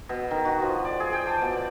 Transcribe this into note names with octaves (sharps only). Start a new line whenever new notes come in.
B2
D#3
F#4
F3
D5
G#4
G5
A5
B2
D5